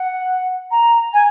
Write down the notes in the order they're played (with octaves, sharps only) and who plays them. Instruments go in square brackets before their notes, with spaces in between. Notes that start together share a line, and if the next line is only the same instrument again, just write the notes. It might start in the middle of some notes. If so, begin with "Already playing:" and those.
Already playing: [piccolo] F#5
A#5
G#5